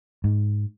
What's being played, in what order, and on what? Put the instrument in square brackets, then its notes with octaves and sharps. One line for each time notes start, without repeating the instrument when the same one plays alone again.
[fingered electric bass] G#2